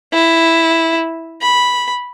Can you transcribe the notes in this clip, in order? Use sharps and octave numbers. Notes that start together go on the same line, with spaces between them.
E4
B5